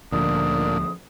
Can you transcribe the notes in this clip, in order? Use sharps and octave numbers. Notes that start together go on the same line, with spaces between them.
D2 A#2 D3 F3 D#6